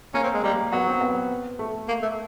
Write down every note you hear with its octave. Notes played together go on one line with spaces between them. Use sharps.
A#3 C#4
C4
G#3
G3 A#3
F#3 B3
C4
B3
A3
A#3
A3